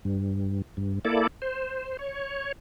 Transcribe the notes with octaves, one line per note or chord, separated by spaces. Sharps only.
G2
G2
A#3 E4 A4 D5
C5
C#5